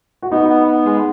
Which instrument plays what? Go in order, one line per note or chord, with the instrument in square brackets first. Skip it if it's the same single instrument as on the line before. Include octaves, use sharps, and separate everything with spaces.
[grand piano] F#4
[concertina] B3 [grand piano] D#4
[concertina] B3
B3
G#3